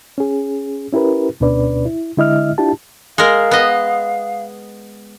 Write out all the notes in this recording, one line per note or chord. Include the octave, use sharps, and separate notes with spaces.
C#4 G#4
C#4 E4 G4 A#4 B4
D2 B2 C#4 D4 B4 D5
E4
D3 G#3 E4 D#5 E5 F6
D4 E4 F4 G4 A5
G#3 A#4 F5
B3 D#5